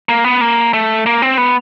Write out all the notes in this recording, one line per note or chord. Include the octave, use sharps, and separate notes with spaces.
A#3
B3
A#3
A3
A#3
C4
B3